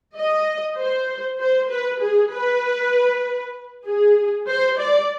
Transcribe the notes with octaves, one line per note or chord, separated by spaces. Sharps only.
D#5
C5
C5
B4
G#4
B4
G#4
C5
D5